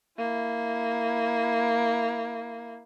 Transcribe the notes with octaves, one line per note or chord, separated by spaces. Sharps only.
A#3 E4